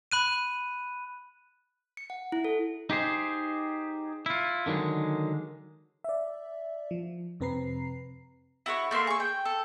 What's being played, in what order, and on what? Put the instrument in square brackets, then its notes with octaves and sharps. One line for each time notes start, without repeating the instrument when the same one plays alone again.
[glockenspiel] B5 F#6 D#7
[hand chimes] C#7
F#5
E4
A4
[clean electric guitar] D#4 G4 G#4 C5
E4 F4
D3 D#3 F#3 G#3
[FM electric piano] D5 E5
F3
F2 C3 C4 B4 A#5 C7
[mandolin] E4 F#4 A4 C#5
A3 A#3 E5 C6
G#4 C#6
G5
A4